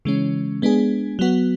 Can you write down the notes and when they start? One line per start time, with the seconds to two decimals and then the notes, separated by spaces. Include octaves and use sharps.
0.05 C#3 E3 G#3 C#4
0.62 G#3 B3 D4 G#4
1.19 F#3 B3 F#4